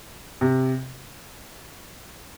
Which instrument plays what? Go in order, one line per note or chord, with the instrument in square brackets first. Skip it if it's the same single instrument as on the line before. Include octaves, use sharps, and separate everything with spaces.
[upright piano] C3